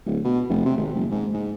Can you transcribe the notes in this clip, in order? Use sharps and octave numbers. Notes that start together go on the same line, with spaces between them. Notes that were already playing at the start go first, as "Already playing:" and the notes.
D1
B2
F1
C3
G#1
F#1
G#2
G#2